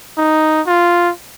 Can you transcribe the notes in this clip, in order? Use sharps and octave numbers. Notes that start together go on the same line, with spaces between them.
D#4
F4